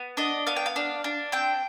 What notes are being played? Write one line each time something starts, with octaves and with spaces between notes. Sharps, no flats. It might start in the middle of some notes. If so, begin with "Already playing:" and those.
Already playing: B3
D4 D#5
B3 F5
G5
F5
D4
D4
C4 G5